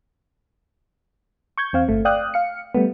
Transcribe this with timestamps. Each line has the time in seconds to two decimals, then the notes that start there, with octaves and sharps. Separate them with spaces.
1.58 C#6 G6 G#6
1.73 E2 C4 F5
1.89 G1 A3
2.05 D5 F5 G5 D#6 F#6
2.34 F5 C#7
2.75 G3 A3 B3